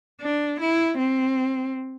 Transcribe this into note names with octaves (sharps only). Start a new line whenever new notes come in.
D4
E4
C4